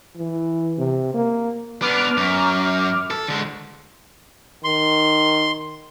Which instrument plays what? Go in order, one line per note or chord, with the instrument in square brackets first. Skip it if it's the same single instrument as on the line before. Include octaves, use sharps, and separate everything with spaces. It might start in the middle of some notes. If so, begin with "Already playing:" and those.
[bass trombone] E3
C3
A#3
[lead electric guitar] B3 D4 [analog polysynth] D6 F6
[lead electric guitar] F#2
A4
D3 G#3
[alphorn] D#3 [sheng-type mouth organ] C6